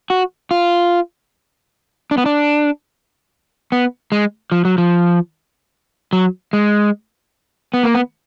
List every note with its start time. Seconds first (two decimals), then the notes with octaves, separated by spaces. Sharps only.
0.10 F#4
0.51 F4
2.11 D4
2.18 B3
2.26 D4
3.72 B3
4.12 G#3
4.52 F3
4.65 F#3
4.78 F3
6.13 F#3
6.53 G#3
7.74 B3
7.83 A#3
7.95 B3